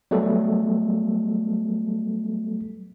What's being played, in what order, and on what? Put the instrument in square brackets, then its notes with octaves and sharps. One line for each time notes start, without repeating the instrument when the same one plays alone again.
[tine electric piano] F#3 G3 A3 B3 A4